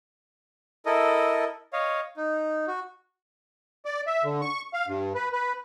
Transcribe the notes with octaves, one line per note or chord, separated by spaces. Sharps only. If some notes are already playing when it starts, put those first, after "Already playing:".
E4 A4 A#4 D#5
C#5 D#5 F5
D#4
F#4
D5
E5
D3
C#6
F5
G2
B4
B4